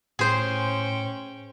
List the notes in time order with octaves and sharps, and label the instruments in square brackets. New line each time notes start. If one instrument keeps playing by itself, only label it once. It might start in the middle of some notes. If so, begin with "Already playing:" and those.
[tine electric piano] A2 [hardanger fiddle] C#4 G5 [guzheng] G#4 C5